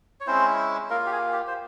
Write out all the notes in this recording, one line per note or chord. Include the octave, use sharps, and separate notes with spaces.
C#5
G#3 C4 C#4 E4 C5
A#3 F4 A#4
G4
G#4
G4
C5